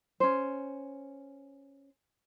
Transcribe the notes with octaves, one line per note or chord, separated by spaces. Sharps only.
C#4 C5